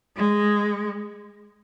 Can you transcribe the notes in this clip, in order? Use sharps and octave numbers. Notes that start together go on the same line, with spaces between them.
G#3